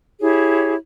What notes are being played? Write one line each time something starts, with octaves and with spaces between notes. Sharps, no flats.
E4 G4 G#4 C#5